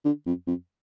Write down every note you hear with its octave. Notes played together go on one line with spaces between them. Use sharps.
D3
F2
F2